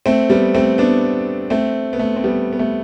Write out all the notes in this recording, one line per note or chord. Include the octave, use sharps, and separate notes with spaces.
A3 C4
G3 B3
A3 C4
B3 D4
A3 C4
B3
A3
C4
G3 B3
B3
A3